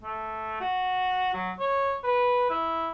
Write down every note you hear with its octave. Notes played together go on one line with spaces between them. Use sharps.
A3
F#4
F#3
C#5
B4
E4